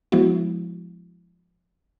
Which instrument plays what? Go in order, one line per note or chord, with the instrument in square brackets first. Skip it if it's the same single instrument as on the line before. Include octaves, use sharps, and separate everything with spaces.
[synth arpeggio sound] F3 G#3 B3 E4 F#4